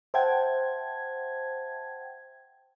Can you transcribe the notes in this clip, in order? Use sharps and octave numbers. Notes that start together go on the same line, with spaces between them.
C5 E5 F#5 G5 A5 G#6